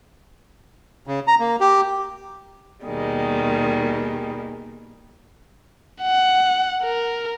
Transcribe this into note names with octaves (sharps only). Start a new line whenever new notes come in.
C#3
A#5
A#3
G4
D#2 B2 D#3 G3 G#3
F#5
A#4